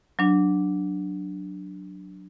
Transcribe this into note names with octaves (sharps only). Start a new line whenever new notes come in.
F#3 D4